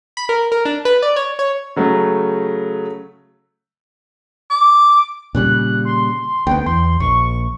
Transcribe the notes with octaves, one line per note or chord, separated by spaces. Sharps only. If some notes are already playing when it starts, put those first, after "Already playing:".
B5
A#4
A#4
D4
B4
D5
C#5
C#5
C#3 F#3 A3
D6
A#2 C#3 G3 F#6
C6
D2 B3 G5
E2 C6
A#1 C#6